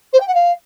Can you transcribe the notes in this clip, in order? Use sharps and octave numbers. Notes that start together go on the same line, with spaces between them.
C5
G5
F#5
F5